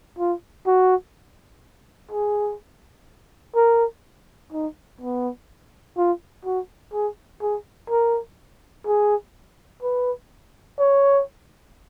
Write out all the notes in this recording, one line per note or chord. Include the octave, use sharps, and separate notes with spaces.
F4
F#4
G#4
A#4
D#4
B3
F4
F#4
G#4
G#4
A#4
G#4
B4
C#5